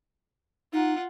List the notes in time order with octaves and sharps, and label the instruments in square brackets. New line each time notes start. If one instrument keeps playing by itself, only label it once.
[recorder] D#4 [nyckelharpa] F4 F#5